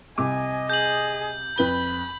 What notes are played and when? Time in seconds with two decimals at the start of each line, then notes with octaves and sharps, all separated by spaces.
0.18 C2 D#5 G#5 D6
0.70 G#4 G6 F#7
1.58 F2 B4 B5 G7